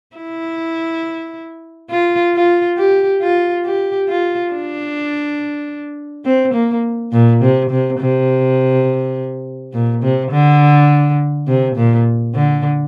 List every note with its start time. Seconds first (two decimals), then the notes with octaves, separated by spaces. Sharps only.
0.16 E4
1.90 F4
2.35 F4
2.78 G4
3.22 F4
3.65 G4
4.08 F4
4.52 D4
6.25 C4
6.54 A#3
7.13 A#2
7.42 C3
7.70 C3
7.99 C3
9.74 A#2
10.03 C3
10.32 D3
11.48 C3
11.76 A#2
12.35 D3